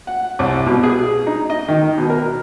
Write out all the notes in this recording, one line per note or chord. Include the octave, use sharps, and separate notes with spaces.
F#5
C2
B2
G#4
D#4
D#5
D#3
B2
A#4